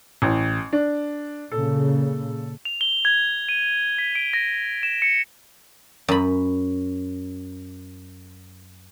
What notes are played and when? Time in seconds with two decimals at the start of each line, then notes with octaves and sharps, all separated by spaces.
0.22 A1
0.73 D4
1.52 A#2 C#3 A4
2.65 F7
2.81 G7
3.05 G#6
3.49 D#7
3.98 B6
4.15 D7
4.33 A#6
4.83 E7
5.02 C#7
6.08 F#2 B5